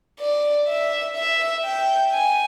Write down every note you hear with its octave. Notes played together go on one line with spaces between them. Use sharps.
D5
E5
E5
G5
G#5